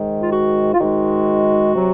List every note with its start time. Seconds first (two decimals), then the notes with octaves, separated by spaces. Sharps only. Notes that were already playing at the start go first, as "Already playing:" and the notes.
Already playing: G#2 D#3 G#3
0.22 F4
0.33 F#4
0.74 F4
0.80 G#2 D#3 G#3 F#4
1.76 C3 F#3